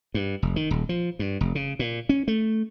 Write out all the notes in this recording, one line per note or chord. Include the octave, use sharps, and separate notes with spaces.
G2
F1
D#3
D#1
F3
G2
F1
C#3
A#2
C#4
A3